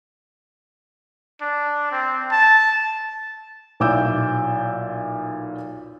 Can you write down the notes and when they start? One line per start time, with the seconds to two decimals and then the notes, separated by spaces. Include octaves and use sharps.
1.42 D4
1.92 C4
2.32 A5
3.80 B1 A#2 E4 D6 E6 G6